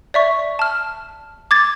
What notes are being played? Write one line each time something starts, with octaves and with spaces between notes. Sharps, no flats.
D5 E5 C#6
A5 F6
D6 G#6 A6